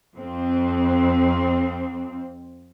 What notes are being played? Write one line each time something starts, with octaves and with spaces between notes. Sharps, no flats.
F2 C4